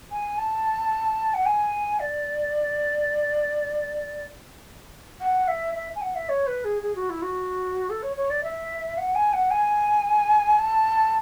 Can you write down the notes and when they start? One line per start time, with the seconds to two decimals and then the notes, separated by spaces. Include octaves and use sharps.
0.12 G#5
0.38 A5
1.34 F#5
1.46 G#5
2.00 D5
5.21 F#5
5.48 E5
5.75 E5
5.95 G#5
6.01 F#5
6.15 E5
6.29 C#5
6.47 B4
6.64 G#4
6.82 G#4
6.95 F#4
7.10 E4
7.22 F#4
7.90 A4
8.02 C#5
8.16 C#5
8.30 D5
8.43 E5
8.98 F#5
9.15 G#5
9.33 F#5
9.51 G#5
10.58 A5